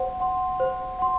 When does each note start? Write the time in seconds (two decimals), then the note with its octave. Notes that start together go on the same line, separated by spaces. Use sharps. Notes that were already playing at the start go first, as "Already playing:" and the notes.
Already playing: C5 F#5 C6
0.20 F#5 C6
0.60 C5
0.99 F#5 C6